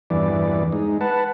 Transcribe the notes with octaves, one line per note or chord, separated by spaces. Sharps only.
E2 G2 E3 D5
G#3 D#4
B4 F#5 A5